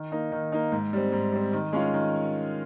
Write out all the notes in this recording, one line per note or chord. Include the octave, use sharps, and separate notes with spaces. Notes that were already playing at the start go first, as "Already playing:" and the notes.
Already playing: D#3
A#3 D#4
D#3
A#3 D#4
G#2
G3 C4
G#2
G3 C4
D#3
G#3 C#4 F4
D#3